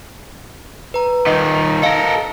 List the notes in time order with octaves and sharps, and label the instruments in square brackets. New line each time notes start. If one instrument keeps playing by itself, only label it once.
[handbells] B4 A#5
[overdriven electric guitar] D#3 F4 [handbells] D#5
[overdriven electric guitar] A4 A#4 [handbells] D#5 F5